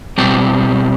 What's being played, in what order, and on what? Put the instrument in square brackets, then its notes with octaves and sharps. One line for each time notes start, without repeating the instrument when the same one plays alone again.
[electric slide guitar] B2 G3 C4